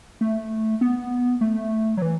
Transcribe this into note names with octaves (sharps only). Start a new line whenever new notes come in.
A3
B3
A3
F#3
E3